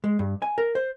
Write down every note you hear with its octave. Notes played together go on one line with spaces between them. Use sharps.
G#3
G2
G#5
A#4
C5